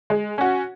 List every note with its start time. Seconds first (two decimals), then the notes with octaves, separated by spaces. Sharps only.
0.10 G#3
0.38 C#4 F#4